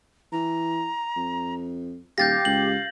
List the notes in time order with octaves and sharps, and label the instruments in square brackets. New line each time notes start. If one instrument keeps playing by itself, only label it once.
[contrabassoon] E3 [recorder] A#5
[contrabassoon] F2
[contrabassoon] D#1 [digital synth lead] G4 [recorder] F5 [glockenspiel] G6 A6 A#6
[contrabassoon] C#2 [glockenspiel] F#7